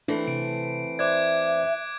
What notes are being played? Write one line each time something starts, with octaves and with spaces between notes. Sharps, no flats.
E3 A3 C4 D4
C3 D7
C5 D5 E5 D6 F#6 G#6